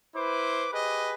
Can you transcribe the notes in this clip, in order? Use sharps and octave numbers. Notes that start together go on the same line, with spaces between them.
E4 B4 C5 D6
G4 G#4 B4 D#5